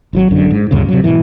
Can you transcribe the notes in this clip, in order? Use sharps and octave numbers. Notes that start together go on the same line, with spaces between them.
G#1 D#3 F#3
G#1 F#2 D3
G#2
D2 G2 A#2 C#3
C3 F#3
G#2 B2 E3